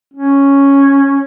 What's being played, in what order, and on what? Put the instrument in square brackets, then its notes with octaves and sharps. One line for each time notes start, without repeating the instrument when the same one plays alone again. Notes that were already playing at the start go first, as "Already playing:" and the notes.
[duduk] C#4